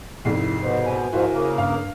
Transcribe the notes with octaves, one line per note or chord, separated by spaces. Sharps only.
C2 F2 G#2 E4 C7
B2 C5
G#5
G#2 F3 E4 F#4 A#4 C5
C#3 A#3
G2 F5